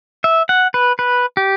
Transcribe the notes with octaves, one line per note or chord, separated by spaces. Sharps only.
E5
F#5
B4
B4
G4